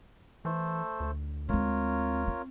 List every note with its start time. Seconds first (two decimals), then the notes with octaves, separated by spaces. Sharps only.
0.45 E3 A3 A4 C5
1.00 D2
1.49 G#3 C4 F4 A#4 C#5
2.27 C4